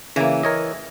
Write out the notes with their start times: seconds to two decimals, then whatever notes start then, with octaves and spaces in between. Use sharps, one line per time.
0.16 C#3 E3 A#3
0.43 A#4 C#5 D#5